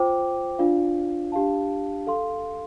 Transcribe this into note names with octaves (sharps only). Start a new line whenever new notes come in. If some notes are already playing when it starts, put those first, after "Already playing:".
Already playing: F4 C5 G5 D6
D4 F4 D5 F5
D4 G4 F5 A5
A4 F5 C6